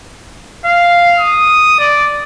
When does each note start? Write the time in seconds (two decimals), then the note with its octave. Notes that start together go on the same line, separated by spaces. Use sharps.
0.65 F5
1.19 D#6
1.79 D5